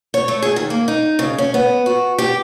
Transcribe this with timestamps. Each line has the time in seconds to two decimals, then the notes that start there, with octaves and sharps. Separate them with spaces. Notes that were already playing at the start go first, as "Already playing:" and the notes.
0.14 C#5
0.28 A3
0.42 G#4
0.56 D#3
0.70 A#3
0.88 D#4
1.19 C#3
1.38 C#4
1.54 B3
1.86 F#4
2.18 G4